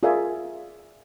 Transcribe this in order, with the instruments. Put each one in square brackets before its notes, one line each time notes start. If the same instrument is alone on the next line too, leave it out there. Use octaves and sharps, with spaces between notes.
[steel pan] F4 G#4 A#4 D5 E5 G#5